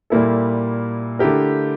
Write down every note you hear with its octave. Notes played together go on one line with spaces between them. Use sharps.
A#2 G3 A#3 E4 A4
D3 A3 E4 G4 A#4